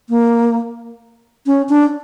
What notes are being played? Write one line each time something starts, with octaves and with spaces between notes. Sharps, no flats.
A#3
C#4
D4